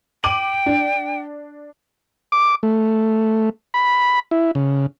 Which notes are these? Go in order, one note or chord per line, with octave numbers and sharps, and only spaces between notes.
G5 D6 D#7 F#7
D4
D6
A3
B5
E4
C#3